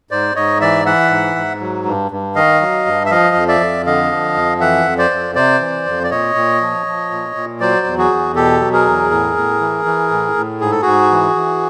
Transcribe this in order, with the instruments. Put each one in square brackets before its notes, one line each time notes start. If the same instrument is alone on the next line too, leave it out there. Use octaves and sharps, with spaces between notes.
[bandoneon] G#2 C5 D5
G#2 C#5 D#5
E3 D5 E5
E3 E5 F#5
G#2
G#2
F#3
G2
G2
D#3 D#5 F5
F#3
G2
E5
F3 D#5 F5
F2
D5 E5
F2
D3 D#5 F5
F3
F2
E3 E5 F#5
F2
C5 D5
F2
C3 C5 D5
E3
F2
D5
A#2 C#5 D#5
A#2
F3
F3
A#2
A#2
F#3 C5 D5
E2
F#4 G#4
E2
B2 G4 A4
F#3
G#4 A#4
E2
A2
A2
E3
E3
A2
A2
G#2 G#4
A4
G#2 F#4 G#4
E3
E3